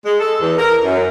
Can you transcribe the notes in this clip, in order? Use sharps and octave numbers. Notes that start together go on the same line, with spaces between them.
G#3
A4
E2
A#4
F#2